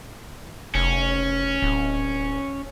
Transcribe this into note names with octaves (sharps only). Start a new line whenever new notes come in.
F1 C#4
D1